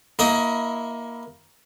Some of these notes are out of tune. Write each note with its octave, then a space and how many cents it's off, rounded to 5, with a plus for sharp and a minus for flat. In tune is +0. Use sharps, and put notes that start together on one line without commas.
A#3 +10 E4 +0 D#5 +25